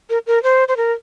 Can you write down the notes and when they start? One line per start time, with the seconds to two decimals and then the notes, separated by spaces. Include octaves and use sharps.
0.10 A#4
0.27 A#4
0.43 C5
0.68 C5
0.77 A#4